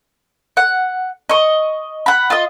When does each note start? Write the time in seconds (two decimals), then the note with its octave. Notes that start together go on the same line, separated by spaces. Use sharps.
0.57 F#5
1.29 D#5 C#6
2.06 F#5 B5
2.30 F4 D#5